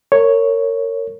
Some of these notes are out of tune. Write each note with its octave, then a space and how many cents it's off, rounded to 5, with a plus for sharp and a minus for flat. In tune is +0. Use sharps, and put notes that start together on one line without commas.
A#4 -25 C#5 +0